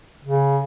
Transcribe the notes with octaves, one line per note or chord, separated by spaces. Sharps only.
C#3